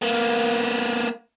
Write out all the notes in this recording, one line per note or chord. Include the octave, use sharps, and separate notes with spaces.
A#3 B3